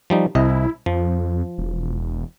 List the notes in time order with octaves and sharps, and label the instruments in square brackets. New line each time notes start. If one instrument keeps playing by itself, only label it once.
[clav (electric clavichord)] F3 G3 D#4
[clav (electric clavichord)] C2 C3 D#5 [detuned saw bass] E4
[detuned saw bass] F2 [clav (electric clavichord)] F3
[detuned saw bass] E1